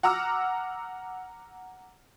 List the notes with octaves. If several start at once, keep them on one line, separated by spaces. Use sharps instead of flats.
F#5 A#5 D6 E6 F6